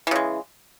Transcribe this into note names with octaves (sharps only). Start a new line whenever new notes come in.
C#3 E3 G#3